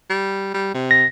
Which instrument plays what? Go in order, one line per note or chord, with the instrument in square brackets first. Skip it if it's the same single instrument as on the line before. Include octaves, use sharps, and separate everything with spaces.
[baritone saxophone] G3
G3
C3
[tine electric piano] A#6